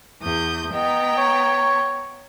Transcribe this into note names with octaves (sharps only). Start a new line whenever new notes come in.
E2 D#6 G6
B3 D#5 G5 A#5
C#5